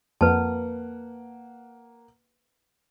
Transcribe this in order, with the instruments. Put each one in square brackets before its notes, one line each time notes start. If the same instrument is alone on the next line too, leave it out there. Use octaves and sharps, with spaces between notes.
[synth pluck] F2 [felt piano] A#3 F#5 [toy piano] B4 A5